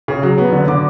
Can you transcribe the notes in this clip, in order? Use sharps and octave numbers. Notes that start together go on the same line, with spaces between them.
C#3
F#3
B3
D3
D3 D6